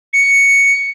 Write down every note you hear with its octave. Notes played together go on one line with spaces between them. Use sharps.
C#7